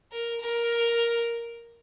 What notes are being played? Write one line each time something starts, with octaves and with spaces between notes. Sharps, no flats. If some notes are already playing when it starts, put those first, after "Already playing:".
A#4
A#4